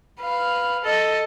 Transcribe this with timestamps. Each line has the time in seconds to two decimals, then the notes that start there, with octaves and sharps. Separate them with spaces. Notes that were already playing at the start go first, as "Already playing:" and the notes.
0.20 B4 F5
0.84 A4 D#5